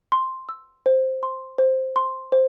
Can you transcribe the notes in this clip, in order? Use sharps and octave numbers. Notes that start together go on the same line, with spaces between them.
C6
E6
C5
C6
C5
C6
C5